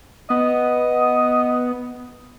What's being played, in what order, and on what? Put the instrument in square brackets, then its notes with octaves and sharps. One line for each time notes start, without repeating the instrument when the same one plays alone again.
[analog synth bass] B3 [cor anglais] D#5